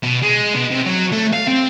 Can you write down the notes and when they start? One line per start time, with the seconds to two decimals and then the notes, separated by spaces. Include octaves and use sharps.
0.03 B2
0.22 G#3
0.54 B2
0.71 C3
0.86 F#3
1.12 A3
1.33 F5
1.48 C4